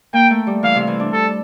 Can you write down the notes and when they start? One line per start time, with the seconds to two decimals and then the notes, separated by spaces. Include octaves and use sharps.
0.13 A#3 G5
0.31 A3
0.47 G3
0.63 E3 F5
0.75 C3
0.87 E3
1.00 D4
1.13 A4